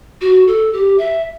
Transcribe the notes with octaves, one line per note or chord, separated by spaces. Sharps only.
F#4
A4
G4
E5